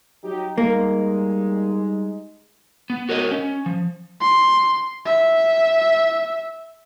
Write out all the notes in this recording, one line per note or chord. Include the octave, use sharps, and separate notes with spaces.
F#3 D#4 G4
G3 G#3 A#3 D#4
B3
F#4 A#4 C#5 D#5
C#4
F3
C6
E5